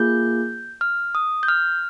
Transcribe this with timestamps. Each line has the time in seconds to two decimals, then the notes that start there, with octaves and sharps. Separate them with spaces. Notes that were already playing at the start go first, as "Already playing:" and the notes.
Already playing: A#3 F4 G#4 G6
0.81 F6
1.15 D#6
1.43 G6
1.48 F6